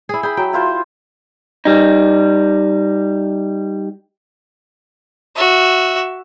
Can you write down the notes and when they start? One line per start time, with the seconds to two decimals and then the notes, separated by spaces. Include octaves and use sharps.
0.09 E4 G#4
0.23 G#4 G5 B5
0.37 F#3 G5
0.53 E4 F4 C5
1.65 G3 D#4
5.36 F#4 E5